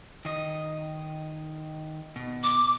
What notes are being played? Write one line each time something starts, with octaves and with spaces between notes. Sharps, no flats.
D#3 D#5
B2
D6